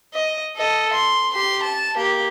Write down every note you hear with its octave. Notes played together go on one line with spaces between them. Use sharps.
D#5
A4 D#5
C6
G4 C6
A5
A#3 G4